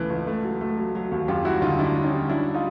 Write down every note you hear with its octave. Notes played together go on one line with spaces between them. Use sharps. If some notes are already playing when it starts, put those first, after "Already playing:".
Already playing: C#2 C#3 E3 A3
C#2
A3
F#3
A3
F#3
F#3
D#2
F#2 F4 G4
G3 E4 F#4
D3 D#4 F4
F#2 D4 E4
G3
C#4 D#4
G3
F#3 D4 E4
D#4 F4